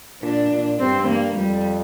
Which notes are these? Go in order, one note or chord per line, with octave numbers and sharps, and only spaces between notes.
A#2 D4
A#2
G2 C4
A#3
F2 G3